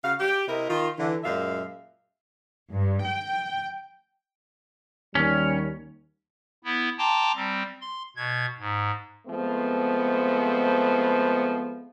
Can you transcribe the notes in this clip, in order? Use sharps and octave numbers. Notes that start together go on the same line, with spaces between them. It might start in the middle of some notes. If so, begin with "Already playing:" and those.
C#3 F#4 F5
G4
C3 E4 A#4 D#5
D#3 F4
D3 E3
F#2 A#2 G#3 E5 F5
G2
G5
D#2 G3 C#4
B3 E4
G5 A5 A#5 C6 D6
G3 C4
C6
B2 G#6
G#2
F3 G#3 A3 B3 C4